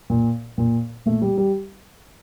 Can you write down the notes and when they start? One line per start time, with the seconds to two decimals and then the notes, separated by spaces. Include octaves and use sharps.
0.10 A#2
0.58 A#2
1.06 A#2 A3
1.22 G3
1.38 G3